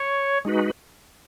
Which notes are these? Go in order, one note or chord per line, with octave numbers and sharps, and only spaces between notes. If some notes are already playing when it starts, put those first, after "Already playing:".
Already playing: C#5
G#3 D#4 F#4 B4